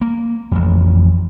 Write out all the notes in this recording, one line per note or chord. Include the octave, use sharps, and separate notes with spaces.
A#3
A1 F2